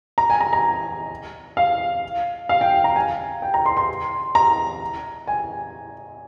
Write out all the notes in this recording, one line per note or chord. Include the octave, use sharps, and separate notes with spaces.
A#5
G#5
A#5
A#5
F5
F5
G5
A#5
G#5
G5
A#5
C6
C6
A#5
G#5